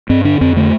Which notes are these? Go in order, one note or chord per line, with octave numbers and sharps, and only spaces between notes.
G2 C4
D3 D4
F2 C4
D3 A3